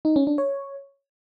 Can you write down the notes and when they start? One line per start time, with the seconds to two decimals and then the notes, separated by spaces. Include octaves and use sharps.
0.05 D#4
0.16 C#4
0.27 D4
0.38 C#5